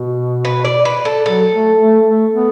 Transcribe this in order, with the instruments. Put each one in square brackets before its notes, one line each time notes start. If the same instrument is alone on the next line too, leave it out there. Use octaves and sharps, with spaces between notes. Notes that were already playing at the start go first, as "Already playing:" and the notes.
Already playing: [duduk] B2
[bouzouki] B4
D5
B4
A4
[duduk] F#3 [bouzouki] A4
[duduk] A3
A3
A3
B3